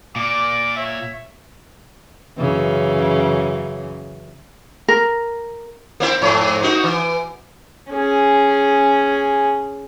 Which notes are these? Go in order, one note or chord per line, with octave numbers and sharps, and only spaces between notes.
A#2 D5 D6
C#5 E5
F#2 C#3 E3
A#4
A#3 C4 E4
F2 G#2
A#3 D#4 F#4
E3
C#4 G#4